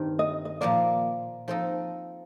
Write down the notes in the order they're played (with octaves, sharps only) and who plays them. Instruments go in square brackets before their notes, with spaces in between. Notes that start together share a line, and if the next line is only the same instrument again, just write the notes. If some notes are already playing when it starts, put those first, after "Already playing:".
Already playing: [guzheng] G2 D#3 G3 C4
[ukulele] D#5
D#5
[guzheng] A#2 F3 A#3 [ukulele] D5
[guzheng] F3 C4 D#4 A4 D#5 [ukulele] C5